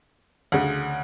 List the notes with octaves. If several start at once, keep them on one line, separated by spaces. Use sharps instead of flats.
D2 C#3